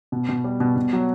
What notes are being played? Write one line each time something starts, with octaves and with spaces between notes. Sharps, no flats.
B2
B2
G3
B2
B2
F#3